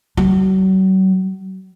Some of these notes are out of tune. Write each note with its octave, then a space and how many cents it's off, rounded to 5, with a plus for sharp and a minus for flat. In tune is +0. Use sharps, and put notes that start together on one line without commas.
F#3 +40